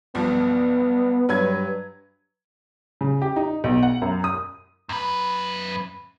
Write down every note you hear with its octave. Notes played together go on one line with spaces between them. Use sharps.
B1 G2 F3 B3
G2 F#3 B4 G#6
C#3
G4
D#4
B1
F#5
F#2
D#6
F#2 B4